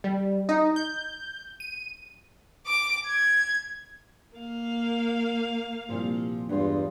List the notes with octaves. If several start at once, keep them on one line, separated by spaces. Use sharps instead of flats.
G3
D#4
G6
D#7
D6
G#6
A#3 F5
C2 A#2 F3
E2 G2 G#3 F4